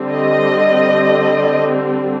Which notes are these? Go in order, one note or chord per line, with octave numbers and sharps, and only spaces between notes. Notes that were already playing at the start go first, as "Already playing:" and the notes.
Already playing: D3 G3 C4
D#5